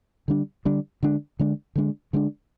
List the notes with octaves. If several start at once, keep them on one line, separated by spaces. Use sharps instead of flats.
D3 G3 D4
D3 G3 D4
D3 G#3 D4
D3 G#3 D4
D3 G#3 D4
D3 G#3 D4